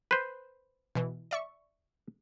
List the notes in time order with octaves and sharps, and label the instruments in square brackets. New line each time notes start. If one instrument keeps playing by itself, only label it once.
[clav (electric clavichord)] B4 C5
[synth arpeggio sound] B2 E3
D5 E5 C#6